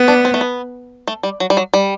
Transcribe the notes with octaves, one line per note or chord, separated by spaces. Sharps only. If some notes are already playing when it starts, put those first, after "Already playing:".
Already playing: B3
D4
C4
A3
B3
A3
G3
F#3
G3
F#3
G3